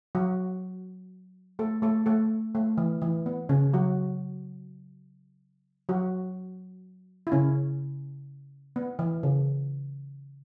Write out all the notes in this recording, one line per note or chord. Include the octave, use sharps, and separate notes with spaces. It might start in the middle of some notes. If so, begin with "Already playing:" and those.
F#3 F#4
A3 A4
A3 A4
A3 A4
A3
E3
E3
B3
C#3 C#4
F#3 F#4
F#3 F#4
E4
C#3 C#4
B3
E3
C#3